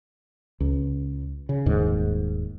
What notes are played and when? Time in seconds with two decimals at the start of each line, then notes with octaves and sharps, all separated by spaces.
0.60 C#2
1.49 C#3
1.66 D#1 D#2 G#2